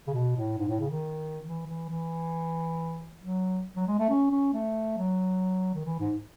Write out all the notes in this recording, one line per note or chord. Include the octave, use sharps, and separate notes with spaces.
C#3
B2
A2
G#2
A2
C#3
D#3
E3
E3
E3
F#3
F#3
G#3
A3
C#4
C#4
A3
F#3
D#3
E3
G#2